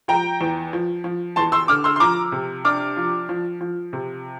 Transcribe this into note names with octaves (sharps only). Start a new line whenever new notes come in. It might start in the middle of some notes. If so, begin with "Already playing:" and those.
F3 G5 A#5
E2
F3
F3
E2 A5 C6
C6 E6
D3 D6 F6
C6 E6
C6
F3 A#5 D6
C3
D4 D6 F6
F3
F3
F3
C3